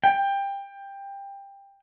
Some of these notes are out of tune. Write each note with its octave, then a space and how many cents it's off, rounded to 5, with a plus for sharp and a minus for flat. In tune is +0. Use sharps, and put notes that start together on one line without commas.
G5 +20